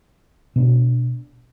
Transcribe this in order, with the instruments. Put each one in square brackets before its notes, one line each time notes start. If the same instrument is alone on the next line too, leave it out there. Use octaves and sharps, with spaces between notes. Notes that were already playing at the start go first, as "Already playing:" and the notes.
[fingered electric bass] B2 B3 D4